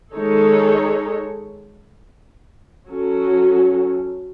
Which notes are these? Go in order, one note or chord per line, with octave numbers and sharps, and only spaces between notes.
D#3 G#3 D#4 A4 C#5
F#3 C#4 F#4 A4